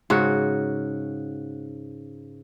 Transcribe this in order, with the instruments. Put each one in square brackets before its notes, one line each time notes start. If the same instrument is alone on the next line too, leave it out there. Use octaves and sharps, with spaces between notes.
[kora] G#2 C#3 F#4